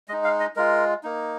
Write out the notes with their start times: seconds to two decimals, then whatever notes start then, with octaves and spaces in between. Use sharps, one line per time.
0.08 G#3 D#5
0.13 D#4
0.24 F5
0.40 D#5
0.56 G#3 F4 A#4
1.03 A#3 D#4